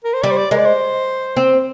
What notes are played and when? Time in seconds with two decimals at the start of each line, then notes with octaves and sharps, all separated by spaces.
0.04 A#4
0.14 C5
0.23 G3 D5
0.31 C5
0.37 D5
0.51 G#3 A#4
0.58 D5
0.65 C5
1.37 C4